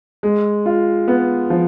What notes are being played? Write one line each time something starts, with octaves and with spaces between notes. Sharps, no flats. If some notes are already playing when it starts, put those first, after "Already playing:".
G#3
F4
B3
F3